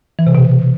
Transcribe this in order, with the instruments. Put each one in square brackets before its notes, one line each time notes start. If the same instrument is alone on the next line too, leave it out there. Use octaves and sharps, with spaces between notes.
[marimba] E3
C3
B2